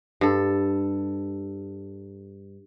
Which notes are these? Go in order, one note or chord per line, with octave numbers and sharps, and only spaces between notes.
G2 A4